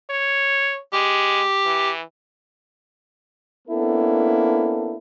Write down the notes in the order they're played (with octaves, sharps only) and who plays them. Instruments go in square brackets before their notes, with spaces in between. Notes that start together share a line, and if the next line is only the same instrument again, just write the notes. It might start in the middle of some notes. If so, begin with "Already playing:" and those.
[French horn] C#5
[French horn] G#3 [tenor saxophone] G4
[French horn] E3
[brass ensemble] A#3 B3 C#4 D4 E4 A4